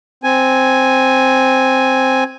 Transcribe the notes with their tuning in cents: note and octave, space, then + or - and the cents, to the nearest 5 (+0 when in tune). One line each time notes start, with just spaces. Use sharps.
C4 +0 G#5 +0